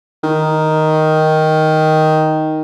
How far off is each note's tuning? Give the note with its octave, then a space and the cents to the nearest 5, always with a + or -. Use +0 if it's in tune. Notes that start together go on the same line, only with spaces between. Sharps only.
D#3 +5